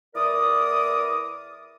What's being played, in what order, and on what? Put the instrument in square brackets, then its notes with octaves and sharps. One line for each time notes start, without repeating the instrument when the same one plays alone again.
[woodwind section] E2 E4 A#4 D5 D6 D#6